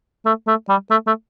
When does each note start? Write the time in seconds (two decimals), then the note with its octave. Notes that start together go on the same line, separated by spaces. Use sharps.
0.26 A3
0.47 A3
0.69 G3
0.91 A3
1.07 A3